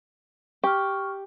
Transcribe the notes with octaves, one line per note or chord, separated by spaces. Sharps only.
G4 C#6 F6